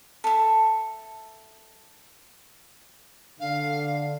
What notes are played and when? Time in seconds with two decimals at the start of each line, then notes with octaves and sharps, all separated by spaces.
0.24 A4 E5
3.39 D3 F5